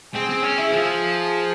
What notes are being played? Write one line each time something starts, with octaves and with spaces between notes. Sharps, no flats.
C4 G#4
C4
C#4
E4
F3 G#4